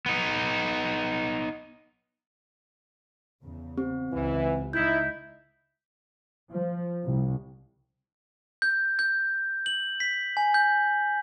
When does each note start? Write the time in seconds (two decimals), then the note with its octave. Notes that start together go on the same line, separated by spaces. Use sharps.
0.06 B3 D#4
3.44 E2 C#3
3.77 C4 G4
4.12 C#2 E3
4.73 C#2 D#4 E4 G6 B6
6.50 F3
7.03 C2
8.62 G6
8.99 G6
9.66 F#7
10.00 B6
10.37 G#5
10.54 G6